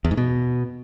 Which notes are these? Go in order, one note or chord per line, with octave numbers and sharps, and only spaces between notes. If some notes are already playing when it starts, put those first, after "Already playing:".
E2
G#2
B2